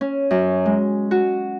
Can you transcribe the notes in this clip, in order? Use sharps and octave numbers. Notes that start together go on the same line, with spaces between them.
C#4
F#2
G#3
F#4